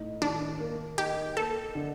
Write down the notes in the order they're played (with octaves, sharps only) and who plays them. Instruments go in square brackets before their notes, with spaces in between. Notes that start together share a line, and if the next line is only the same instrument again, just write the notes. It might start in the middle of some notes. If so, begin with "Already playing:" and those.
Already playing: [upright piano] A2 D#4
[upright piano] D#3 [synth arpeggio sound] D4
[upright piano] A#3
[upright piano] D#4 [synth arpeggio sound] G4
[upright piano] A#3 [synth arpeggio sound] A4
[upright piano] D3